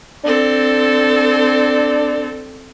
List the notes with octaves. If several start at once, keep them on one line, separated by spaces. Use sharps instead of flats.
C4 D4 A4